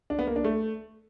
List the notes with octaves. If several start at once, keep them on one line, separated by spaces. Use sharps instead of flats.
D4
B3
A#3
D4
A3